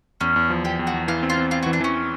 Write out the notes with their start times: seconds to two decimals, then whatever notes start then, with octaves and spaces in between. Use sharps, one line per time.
0.21 E2 C#4
0.36 E2
0.50 F3
0.64 E2 G4
0.79 E2
0.87 F#4
0.94 E2
1.08 E3 F4
1.23 C4
1.30 F4
1.38 C4
1.51 C4 F4
1.63 F#4
1.66 E3
1.73 D4
1.81 E3 C#4